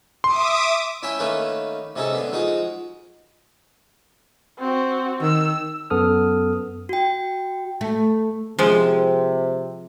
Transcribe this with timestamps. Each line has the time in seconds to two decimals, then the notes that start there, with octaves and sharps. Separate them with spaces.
0.24 E5 C6 D6 D#6
1.03 C#4 E4 C#5 E5 G5 G#5
1.19 D#3 A3 A#3 C#4 D#4 B4
1.96 C3 C#4 D#4 G#4 A4
2.12 D3 B3 D4
2.32 F3 G#3 D#4 F#4 G#4
4.59 C4 F#4
5.22 D#3 E6
5.90 F#2 B3 A4 D#6 F6
6.89 F#4 G5
7.81 A3
8.59 C3 F3 G#3